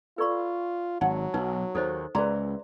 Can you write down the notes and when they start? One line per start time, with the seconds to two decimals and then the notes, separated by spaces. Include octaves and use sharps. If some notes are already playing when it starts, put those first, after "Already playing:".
0.18 F4 A4 B4 D5 B5 C#6
1.01 G#1 F#3 D#4 F#5
1.34 B1 D#4 B4
1.75 D#2 A4 C5 C#5 D#5
2.15 C#2 G#4 B4 D5 E5 A#5 C6